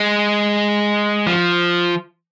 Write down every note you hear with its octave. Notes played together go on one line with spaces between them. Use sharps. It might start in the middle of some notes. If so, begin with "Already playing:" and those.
Already playing: G#3
F3